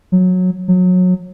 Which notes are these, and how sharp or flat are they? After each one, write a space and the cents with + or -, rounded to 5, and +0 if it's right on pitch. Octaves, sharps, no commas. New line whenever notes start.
F#3 -15
F#3 -25